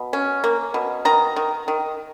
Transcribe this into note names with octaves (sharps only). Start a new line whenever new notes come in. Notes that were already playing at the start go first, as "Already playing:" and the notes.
Already playing: B2
C#4
A#3
B2
D#3 A#5
D#3
D#3